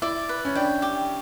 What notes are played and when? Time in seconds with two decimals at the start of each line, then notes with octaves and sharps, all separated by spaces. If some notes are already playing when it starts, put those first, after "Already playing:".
0.02 E4 D5
0.29 B4
0.45 C#4
0.55 D4 G5
0.82 G4